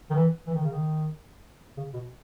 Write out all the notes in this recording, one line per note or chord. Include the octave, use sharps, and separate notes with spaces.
D#3
E3
E3
D#3
C#3
D#3
C#3
B2